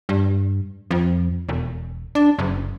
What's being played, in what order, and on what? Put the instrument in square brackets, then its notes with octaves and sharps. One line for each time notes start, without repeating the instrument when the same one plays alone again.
[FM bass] G2
F2
E1
D4
F#1